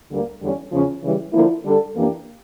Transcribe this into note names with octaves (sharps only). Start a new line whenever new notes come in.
D2 D3 G3 A#3
E2 D3 G3 C#4
E2 C#3 F3 C#4
C#3 E3 G3
D3 F3 A#3 E4
D3 G3 D4 A4
F2 E3 A#3 D4 G4